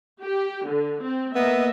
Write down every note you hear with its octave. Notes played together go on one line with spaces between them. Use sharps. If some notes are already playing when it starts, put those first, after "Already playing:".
G4
D3
C4
A#3 B3 D#5 E5